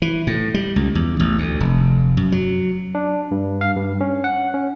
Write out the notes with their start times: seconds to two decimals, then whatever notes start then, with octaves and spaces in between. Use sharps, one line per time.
0.02 E3
0.27 A2
0.54 G3
0.76 C#2
0.95 E2
1.20 A1
1.38 D2
1.60 F1
2.17 F#2
2.32 F#3
2.95 D4
3.31 G2
3.61 F5
3.76 G2
4.01 C#4
4.24 F#5
4.54 C#4